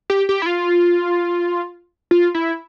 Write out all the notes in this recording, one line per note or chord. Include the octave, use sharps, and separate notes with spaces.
G4
G4
E4
F4
F4
E4